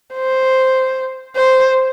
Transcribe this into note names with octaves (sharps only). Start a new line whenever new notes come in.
C5
C5